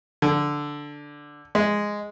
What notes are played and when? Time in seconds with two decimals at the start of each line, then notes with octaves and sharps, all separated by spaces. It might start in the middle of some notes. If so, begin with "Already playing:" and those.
0.22 D3
1.55 G#3